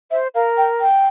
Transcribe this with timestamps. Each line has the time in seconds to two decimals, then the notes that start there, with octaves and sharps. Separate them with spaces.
0.11 C5 E5
0.35 A#4 F5
0.57 G5
0.81 G5